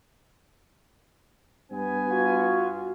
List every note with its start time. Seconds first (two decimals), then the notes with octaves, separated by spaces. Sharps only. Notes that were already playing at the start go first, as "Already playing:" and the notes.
1.72 G2 B3 G#5
2.10 F4 F#4